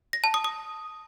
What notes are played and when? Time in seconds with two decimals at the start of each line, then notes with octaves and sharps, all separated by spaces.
0.13 A#6
0.24 A5
0.34 D#6
0.44 D#6